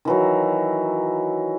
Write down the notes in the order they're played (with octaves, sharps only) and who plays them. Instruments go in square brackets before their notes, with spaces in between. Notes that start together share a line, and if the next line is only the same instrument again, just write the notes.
[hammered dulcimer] D#3 E3 F#3